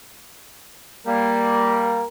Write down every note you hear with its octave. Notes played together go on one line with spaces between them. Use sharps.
G3 A#3 A#4